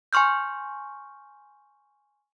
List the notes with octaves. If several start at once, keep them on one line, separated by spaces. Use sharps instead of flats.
G#5 C6 C#6 F6 G6